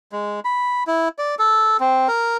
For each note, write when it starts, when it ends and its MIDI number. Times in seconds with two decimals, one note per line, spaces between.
0.12 0.40 56
0.45 0.84 83
0.87 1.08 64
1.18 1.35 74
1.39 1.77 69
1.80 2.08 60
2.08 2.37 70